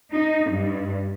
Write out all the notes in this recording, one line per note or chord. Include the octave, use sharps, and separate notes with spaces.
D#4
G2